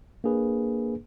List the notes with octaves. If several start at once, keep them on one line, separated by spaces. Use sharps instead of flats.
A#3 D4 G#4 B4